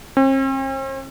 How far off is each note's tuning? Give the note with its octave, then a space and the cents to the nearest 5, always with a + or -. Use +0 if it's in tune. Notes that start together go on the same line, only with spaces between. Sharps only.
C4 +45